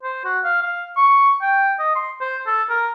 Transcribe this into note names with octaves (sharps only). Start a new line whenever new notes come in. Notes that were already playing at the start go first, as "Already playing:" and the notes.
C5
F#4
F5
F5
C#6
G5
D#5
C6
C5
A4
A#4